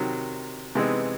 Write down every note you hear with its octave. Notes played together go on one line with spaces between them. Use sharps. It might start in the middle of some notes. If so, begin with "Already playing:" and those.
Already playing: C3 D#3 F#3
C3 E3 G#3 B3 D#4